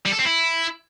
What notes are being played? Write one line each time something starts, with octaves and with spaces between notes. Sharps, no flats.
G3
A4
C4
E4